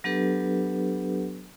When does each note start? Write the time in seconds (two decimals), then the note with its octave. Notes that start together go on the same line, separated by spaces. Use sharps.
0.04 F#3 B3 D4 G4 A4 B4